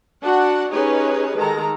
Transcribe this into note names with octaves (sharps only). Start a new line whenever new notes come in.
D4 F#4 F#5
C#4 D#4 G4 G#4 B4 C#5
D#3 G#3 A4 A#5